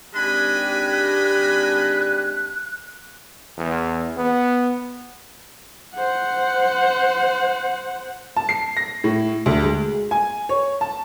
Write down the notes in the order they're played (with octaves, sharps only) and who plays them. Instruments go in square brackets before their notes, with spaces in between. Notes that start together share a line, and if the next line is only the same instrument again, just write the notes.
[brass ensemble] G#1 D4 G4 [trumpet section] D#5 G#5 B5 [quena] F#6
[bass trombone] E2
B3
[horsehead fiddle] C5 F#5
[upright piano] A5
C7
A#6
A2
D2
G#3
G#5
C#5
A5